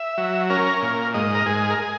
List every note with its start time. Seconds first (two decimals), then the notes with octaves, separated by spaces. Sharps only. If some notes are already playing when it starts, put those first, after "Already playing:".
Already playing: E5
0.18 F#3
0.50 C#4 A#4
0.82 A#2
1.14 G#2 D#5
1.35 A#4
1.46 G#2 G#4
1.70 A#4
1.78 G#4